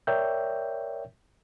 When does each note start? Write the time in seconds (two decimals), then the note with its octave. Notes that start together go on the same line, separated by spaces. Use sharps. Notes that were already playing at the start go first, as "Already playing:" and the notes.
0.07 A#4 C#5 D5 E5 G5 G6